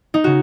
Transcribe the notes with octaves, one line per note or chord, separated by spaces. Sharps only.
D#4
C#3 F#4